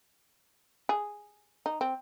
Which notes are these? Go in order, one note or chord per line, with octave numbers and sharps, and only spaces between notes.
G#4
D#4
C4